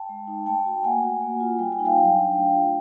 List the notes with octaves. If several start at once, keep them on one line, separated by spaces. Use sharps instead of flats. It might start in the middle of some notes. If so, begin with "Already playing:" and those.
Already playing: G5 A5
G#3
D#4
A3 G5 A5
F#4
A#3 F#5 G#5
F#4
A#3
F4
G3 G5
G#5
D#4
F5 G5
F#3
D4
A3
F4